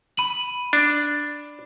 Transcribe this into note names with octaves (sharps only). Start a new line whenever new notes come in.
B5 D#7 F#7
D4